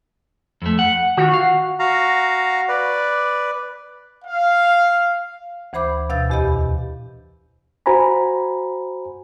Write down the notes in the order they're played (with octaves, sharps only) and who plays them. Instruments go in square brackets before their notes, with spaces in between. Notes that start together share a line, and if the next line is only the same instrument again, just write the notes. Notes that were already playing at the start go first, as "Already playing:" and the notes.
[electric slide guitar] F2 A3
F#5
[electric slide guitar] D#3 F4 [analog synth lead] F#4
[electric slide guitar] F5
[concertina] F#4 F5 A#5
B4 D5
[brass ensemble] F5
[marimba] D2 E3 C5 B5 D6 G6
D2 B2 F5 E6 G6 A6
E2 A#2 G4 D#5 B5 G6
[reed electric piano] F#4 C5 G#5 A#5 B5